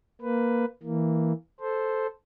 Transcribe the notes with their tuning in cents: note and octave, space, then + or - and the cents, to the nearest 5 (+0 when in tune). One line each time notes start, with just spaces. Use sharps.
A#3 +5 B4 +10
E3 -15 A#3 -10
A4 -5 C5 +0